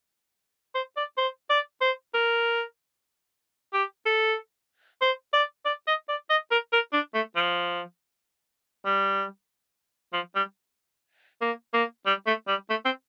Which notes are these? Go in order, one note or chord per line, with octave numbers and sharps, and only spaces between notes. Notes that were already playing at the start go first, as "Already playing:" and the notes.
C5
D5
C5
D5
C5
A#4
G4
A4
C5
D5
D5
D#5
D5
D#5
A#4
A#4
D4
A3
F3
G3
F3
G3
A#3
A#3
G3
A3
G3
A3
C4